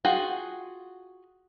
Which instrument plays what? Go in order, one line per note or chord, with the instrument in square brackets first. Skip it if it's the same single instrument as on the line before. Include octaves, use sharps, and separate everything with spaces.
[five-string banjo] F4 F#4 G#4 G5